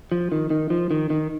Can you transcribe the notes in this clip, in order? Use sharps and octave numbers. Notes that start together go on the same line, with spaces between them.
F3
D#3
D#3
F3
D#3
D#3